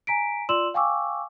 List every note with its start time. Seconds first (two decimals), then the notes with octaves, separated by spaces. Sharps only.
0.07 G#5 A#5 B6 D7
0.49 F4 D5 C6 E6 E7 F#7
0.74 F5 G5 G#5 C#6 D6 E6